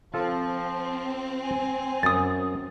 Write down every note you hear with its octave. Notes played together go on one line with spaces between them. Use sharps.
F3 C4 F4 A4
G#5
F#2 D#6 A6